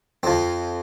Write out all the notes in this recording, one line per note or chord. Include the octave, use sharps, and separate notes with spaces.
F2 F3 C4